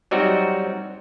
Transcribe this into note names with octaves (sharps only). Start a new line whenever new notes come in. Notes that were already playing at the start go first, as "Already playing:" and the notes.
F#3 G3 C4 D#4 F#4